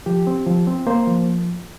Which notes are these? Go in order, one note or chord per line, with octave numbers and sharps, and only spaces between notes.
F3 G4
C4
F3
C4
A#3 C5
F3